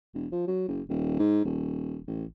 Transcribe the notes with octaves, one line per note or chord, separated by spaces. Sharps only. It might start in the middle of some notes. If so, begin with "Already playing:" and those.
E1
F3
F#3
F#1
D#1
G#2
D#1
A1